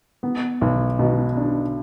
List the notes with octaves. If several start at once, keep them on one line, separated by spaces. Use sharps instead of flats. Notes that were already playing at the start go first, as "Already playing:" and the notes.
B3
B1
B2
D4